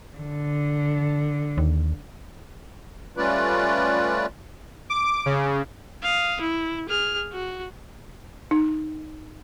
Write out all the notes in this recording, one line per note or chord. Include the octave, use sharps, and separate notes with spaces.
D3
D#2
G3 A3 C#4 F4 B4 D5
D6
C#3
F5 D#6
E4
G#4 F6
F#4
D#4